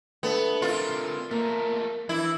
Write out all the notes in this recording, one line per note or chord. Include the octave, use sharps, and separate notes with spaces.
A3 B3 D4 A4
C4 F4 A#4 D5
A3 A#3 A#4
E3 D4 E4